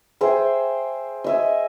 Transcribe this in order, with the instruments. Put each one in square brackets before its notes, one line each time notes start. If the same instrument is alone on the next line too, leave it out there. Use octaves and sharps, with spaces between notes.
[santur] G#4 C5 E5 G5
D#5 E5 G#5